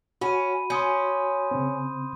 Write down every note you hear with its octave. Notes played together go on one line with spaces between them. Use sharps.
C#4 F#4 B5 D#7
C#4 C6 D#6 G6
C#3 C4